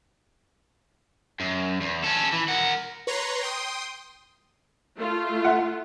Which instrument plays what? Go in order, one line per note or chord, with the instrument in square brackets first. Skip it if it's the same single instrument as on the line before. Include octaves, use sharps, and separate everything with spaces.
[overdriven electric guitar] F#2
E2
C#4 A4
E3
A#4 F#5
[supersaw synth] B4 C#5 A#5 C6
G5 C6 D#6
[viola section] A3 F4
[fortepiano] E5 F#5